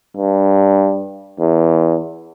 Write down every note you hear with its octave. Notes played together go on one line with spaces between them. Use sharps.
G2
E2